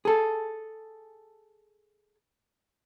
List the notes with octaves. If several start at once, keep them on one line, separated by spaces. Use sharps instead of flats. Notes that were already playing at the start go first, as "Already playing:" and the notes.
G#4 A4